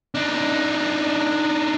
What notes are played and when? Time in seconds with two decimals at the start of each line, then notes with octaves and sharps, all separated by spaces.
0.15 D4 D#4